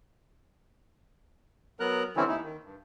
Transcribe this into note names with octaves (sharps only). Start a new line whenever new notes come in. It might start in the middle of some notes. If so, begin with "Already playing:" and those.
F#3 B3 A#4 A#5 F#6
D3 E3 G3 C4 C#4 E4
D#2 D#4 E4
D#3
G2